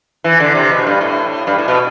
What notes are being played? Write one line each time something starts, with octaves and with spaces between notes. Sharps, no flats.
E3
D3
C3
B2
G2
A2
G2
A2
B2